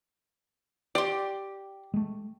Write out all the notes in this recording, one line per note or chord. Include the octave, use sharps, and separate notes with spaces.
G4 D5 C6
G#3 A3